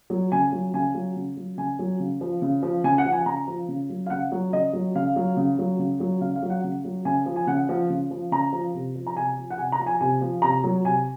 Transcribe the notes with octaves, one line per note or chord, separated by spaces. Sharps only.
F#3
C#3 G#5
F#3
C#3 G#5
F#3
C#3
F#3
C#3 G#5
F#3
C#3
F3
C#3
F3
C#3 G#5
F#5
F3
G#5
C#3 A#5
F3
C#3
F#3
F5
C#3 F#5
F#3
C#3 D#5
F#3
C#3 F5
F#3
C#3
F#3
C#3
F#3
C#3 F5
F5
F#3
F#5
C#3
F#3
C#3 G#5
F3
G#5
C#3 F#5
F3
C#3
F3
C#3 A#5
F3
C3
F3
A#5
C3 G#5
F3
F#5
C3 G#5
A#5
F3
G#5
C3 G#5
F3
C3 A#5
F#3
C3 G#5